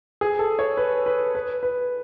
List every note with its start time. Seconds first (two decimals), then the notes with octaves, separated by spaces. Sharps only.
0.21 G#4
0.39 A4
0.59 C#5
0.77 B4
1.06 B4
1.35 B4
1.63 B4